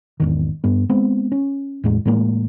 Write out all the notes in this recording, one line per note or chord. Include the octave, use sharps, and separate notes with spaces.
G#1 E2 D#3
G2 B3
G#3 B3 C4
C#4
E2 A2 G#3
A2 E3 G#3 A#3